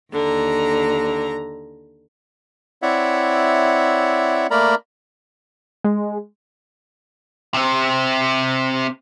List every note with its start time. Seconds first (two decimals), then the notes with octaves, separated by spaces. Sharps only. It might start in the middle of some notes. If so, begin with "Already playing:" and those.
0.12 D#2 D3 A#5
2.82 C4 E4 C#5 D5 E5 F#5
4.51 A3 A#3 A#4 D5 A#5 B5
5.84 G#3
7.54 C3 C4